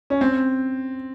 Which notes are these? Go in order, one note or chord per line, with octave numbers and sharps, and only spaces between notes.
C#4
C4